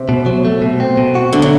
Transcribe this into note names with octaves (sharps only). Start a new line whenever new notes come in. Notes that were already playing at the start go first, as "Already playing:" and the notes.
Already playing: C3
B2
F#3
A3
B2
C4
B2
F#4
D3 A3
F#3